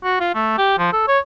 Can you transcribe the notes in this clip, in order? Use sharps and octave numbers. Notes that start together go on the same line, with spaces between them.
F#4
F4
A3
G4
F3
A4
C#5